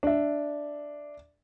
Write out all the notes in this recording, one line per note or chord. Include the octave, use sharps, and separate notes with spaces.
D4 E5